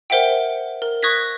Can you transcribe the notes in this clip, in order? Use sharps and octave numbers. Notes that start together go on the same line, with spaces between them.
A#4 C5 E5 F#5 G5
A#4
C#6 D#6 F#6 G#6 A#6 B6